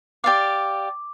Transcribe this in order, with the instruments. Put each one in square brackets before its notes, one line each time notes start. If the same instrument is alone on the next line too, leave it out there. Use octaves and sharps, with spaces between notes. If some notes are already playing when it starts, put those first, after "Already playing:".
[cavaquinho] G4 D5 F5 [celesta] D6